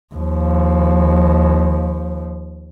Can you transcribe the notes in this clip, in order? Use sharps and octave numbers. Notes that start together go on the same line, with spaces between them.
D#2 F3